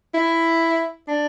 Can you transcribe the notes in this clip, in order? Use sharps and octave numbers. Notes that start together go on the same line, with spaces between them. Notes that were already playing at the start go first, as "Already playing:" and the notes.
E4
D4